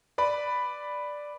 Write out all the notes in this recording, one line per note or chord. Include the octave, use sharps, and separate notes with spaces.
B4 D5 B5